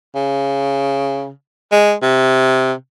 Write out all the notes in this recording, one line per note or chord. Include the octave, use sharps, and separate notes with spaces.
C#3
G#3
C3